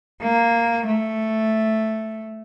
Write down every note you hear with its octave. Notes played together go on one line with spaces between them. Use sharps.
A#3
A3